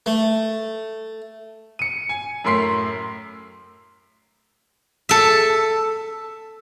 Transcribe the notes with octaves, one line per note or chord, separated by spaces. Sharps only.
A3
C#7 D#7
G#5
F#2 A2 A#4 C6 B6 C7
A4 E5